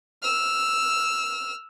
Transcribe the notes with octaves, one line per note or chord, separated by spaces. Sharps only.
E6 F6